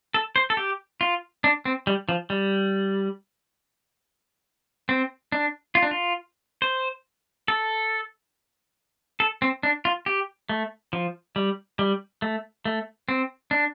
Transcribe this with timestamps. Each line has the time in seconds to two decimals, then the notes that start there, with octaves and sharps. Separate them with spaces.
0.14 A4
0.36 C5
0.50 A4
0.57 G4
1.01 F4
1.44 D4
1.65 C4
1.87 G3
2.09 F3
2.30 G3
4.89 C4
5.32 D4
5.75 F4
5.83 D4
5.91 F4
6.62 C5
7.48 A4
9.20 A4
9.42 C4
9.63 D4
9.85 F4
10.06 G4
10.49 A3
10.93 F3
11.36 G3
11.79 G3
12.22 A3
12.65 A3
13.09 C4
13.51 D4